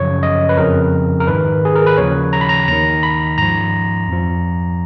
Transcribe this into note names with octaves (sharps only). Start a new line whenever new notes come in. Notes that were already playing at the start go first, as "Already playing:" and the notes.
Already playing: F#2 C#3 F3 C#5
D#5
B4
F2 C#3 F3 A#4
A#4
G#2 D#3 B4
G#4
A#4
B4
D#2 C#3 F3 C#5
A#5
B5
A#5
D#2 D#3 A#5
B5
G#2 F3 A#5
F2 F3